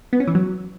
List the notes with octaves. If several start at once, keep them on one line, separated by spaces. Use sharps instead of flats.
B3
C#4
E3
F#3